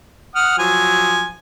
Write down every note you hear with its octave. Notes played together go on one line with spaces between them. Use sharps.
F#5 D#6 F6
F3 F#3 G#5